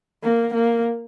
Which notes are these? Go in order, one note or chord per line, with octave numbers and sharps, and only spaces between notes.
A#3
A#3